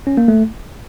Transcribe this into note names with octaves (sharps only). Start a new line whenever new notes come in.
C#4
A#3
A3